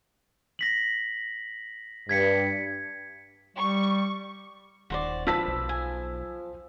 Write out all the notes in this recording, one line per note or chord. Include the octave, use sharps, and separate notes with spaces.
A#6 B6 F#7
G2 G#6 B6 C#7
G3 C#6
D#1 F#4 C5 D5
F3 B4 A5 B5 E6 B6
B1
G#5